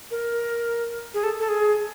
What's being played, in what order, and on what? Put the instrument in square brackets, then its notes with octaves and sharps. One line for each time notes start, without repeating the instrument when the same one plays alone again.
[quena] A#4
G#4
A4
A4
G#4